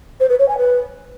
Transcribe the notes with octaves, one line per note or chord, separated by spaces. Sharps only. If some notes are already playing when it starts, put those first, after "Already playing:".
C5
B4
C#5
G#5
B4